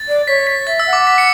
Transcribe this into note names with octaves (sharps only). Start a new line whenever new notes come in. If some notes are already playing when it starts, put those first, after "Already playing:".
Already playing: A6
D5
C#5 B6
B6
E5 A6
E6
F#5
D6
B6
C#7